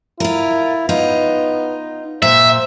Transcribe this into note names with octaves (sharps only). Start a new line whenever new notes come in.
E4 F4 A#4
B3 D#4 F4
A#2 C5 E5